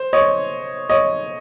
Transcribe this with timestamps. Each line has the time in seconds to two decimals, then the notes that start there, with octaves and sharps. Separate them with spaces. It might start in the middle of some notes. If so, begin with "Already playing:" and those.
Already playing: C5
0.13 C#5 D#5
0.90 C#5 D#5